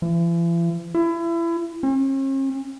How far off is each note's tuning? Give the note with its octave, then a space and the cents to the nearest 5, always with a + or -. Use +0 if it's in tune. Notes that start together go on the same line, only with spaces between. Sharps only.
E3 +45
E4 +30
C#4 -45